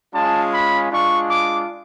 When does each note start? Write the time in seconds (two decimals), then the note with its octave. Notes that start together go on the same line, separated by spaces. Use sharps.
0.14 G#3 C#4 F4 A5
0.53 B5
0.92 G#3 D4 F4 C#6
1.31 D6